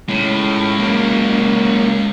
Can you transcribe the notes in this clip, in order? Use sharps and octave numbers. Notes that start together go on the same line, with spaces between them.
A2 G#3 C#4
F#3 A#3